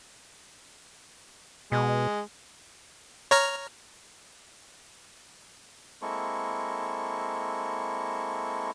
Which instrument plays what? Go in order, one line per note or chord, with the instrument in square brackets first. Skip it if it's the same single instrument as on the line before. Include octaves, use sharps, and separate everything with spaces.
[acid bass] B2 [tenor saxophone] G#3
[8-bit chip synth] C#5 A#5 F6
[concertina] G#3 A#3 C4 E4 A4 C#6